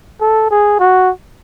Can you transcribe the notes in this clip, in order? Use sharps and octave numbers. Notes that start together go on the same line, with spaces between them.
A4
G#4
F#4